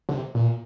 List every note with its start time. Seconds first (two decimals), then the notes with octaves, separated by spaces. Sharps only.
0.09 D3
0.14 C3
0.35 A#2